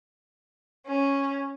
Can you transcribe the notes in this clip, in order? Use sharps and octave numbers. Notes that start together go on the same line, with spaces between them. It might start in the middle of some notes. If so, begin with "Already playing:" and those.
C#4